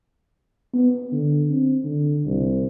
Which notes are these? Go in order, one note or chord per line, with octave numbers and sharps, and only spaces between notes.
B3
D3
C4
D3
C2